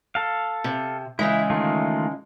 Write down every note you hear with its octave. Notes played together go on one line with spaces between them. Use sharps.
A4 F5
C3
C#3 E3 G#3 E4
D#3 A3 F4